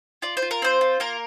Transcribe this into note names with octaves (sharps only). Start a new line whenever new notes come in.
F4 D5
C5
F4
A#4
C4 C5
F4
A#3 A#4